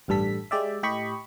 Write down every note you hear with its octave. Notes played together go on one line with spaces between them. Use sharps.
A1 G2 G3 A4 B6
G#3 G4 D5 E5
A2 G4 D#5 B5 C#6